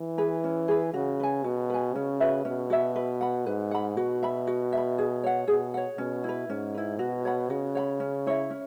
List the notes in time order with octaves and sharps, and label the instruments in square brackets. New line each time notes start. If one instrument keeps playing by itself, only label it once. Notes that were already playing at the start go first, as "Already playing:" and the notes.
Already playing: [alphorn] E3
[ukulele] G#4 B4
C#4
G#4 B4
[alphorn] C#3 [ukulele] F#4
[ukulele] B4 G#5
[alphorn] B2 [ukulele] F#4
[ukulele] B4 G#5
[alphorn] C#3 [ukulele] C#4
[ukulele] F#4 B4 E5
[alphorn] B2 [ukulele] C#4
[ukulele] F#4 B4 E5
B4
F#5 B5
[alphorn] G#2 [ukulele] B4
[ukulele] F#5 B5
[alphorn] B2 [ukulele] F#4
[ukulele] E5 B5
F#4
E5 B5
G#4
C#5 F#5
[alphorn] B2 [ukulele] G#4
[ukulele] C#5 F#5
[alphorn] B2 [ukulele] C#4
[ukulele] E4 B4
[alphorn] G#2 [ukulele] C#4
[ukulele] E4 B4
[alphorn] B2 [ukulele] F#4
[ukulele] C#5 F#5 B5
[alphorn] C#3 [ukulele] F#4
[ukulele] C#5 F#5 B5
C#4
E4 C#5 E5
C#4